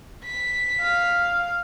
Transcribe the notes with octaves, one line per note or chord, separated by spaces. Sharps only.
B6
F5